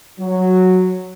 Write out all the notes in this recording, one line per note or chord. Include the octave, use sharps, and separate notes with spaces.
F#3